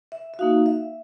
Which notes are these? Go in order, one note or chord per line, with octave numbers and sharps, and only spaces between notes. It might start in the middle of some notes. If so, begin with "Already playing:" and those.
E5
E5
A#3 D#4 F#4 F5
E5